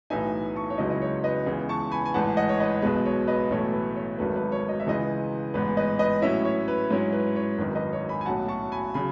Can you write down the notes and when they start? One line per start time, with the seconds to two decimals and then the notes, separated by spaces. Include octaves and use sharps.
0.10 B1 A2 E3 B3 D#4 E5 G#5
0.56 A5 C#6
0.70 C#5
0.78 C#2 C#3 F#3 C#4 E4 B4 D#5
0.90 D#5
1.02 C#5
1.24 B4 D#5
1.46 C#2 C#3 E3 B3
1.69 A5 C#6
1.92 G#5 B5
2.06 G#5
2.14 A1 G#2 E3 F#5 A5
2.37 D#5 F#5
2.49 C#5
2.60 B4 D#5
2.82 B1 B2 G#3 B4
3.05 C#5
3.28 B4 D#5
3.50 B1 A2 E3 A3 E4 C#5
3.73 B4
3.96 C#5
4.18 G#1 G#2 D#3 F#3 A3 B4
4.36 B4
4.52 C#5
4.69 D#5
4.80 E5
4.87 C#2 C#3 E3 B4 D#5
5.54 A1 G#2 E3 B3 B4
5.77 B4 D#5
5.99 B4 D#5
6.22 A2 F#3 C#4 E4 C#5 E5
6.45 C#5
6.68 B4
6.90 G#2 F#3 C#4 E4 C#5
7.13 B4
7.36 C#5
7.58 G#1 F#2 D#3 B4
7.75 B4 D#5
7.93 C#5
8.09 G#5 B5
8.21 G#5
8.26 B1 A2 F#3 C#4 F#5 A5
8.48 A5 C#6
8.72 G#5 B5
8.94 C#3 F#3 G#5 B5